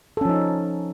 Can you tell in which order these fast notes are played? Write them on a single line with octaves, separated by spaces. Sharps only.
A4 C#4 F3 D#4